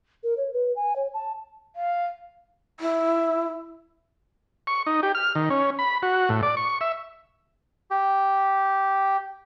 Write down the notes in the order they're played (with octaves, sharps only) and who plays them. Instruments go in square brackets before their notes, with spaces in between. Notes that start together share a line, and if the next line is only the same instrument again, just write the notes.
[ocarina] A#4
C#5
B4
G#5
C#5
A5
[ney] F5
[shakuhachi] E4
[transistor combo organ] C#6
D#4
G4
F6
D#3
C#4
B5
F#4
A2
D5
C#6
E5
[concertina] G4